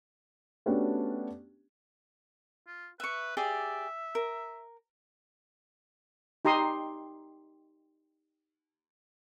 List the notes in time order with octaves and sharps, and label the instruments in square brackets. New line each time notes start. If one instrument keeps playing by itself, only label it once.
[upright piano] A3 B3 C#4 D4 F#4 G4
[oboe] F4
[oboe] B4 [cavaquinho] E5 C#6
[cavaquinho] G4 G#4 D5 [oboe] E5
[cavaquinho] A#4
[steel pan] D#4 G4 A#5 C6 D#6